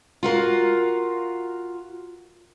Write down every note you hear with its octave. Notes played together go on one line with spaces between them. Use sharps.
F4 F#4 A#4 F5